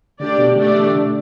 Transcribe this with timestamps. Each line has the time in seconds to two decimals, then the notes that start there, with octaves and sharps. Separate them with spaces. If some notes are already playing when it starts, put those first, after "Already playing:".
0.20 D3 A3 D4 G4 D5
0.38 B2
0.56 D3 A3 D4 G4 D5
0.75 E3
0.94 D3